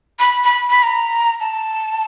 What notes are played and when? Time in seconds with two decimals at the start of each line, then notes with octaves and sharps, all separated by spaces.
0.19 B5
0.44 B5
0.70 B5
0.83 A#5
1.40 A5